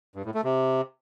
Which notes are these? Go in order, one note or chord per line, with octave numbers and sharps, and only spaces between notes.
G2
A2
A3
C3